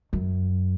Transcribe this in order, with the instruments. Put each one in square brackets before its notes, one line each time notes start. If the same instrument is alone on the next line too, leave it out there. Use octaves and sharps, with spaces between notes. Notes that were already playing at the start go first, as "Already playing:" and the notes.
[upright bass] F#2